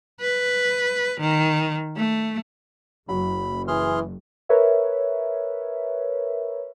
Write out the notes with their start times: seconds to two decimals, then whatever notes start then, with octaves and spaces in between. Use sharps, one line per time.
0.21 B4
1.21 D#3
1.97 A3
3.09 F#1 F#3 B5
3.68 E3 G#4 C6 F6
4.49 A#4 B4 C#5 E5